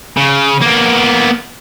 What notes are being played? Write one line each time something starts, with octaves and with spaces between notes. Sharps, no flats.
C#3
A#3 B3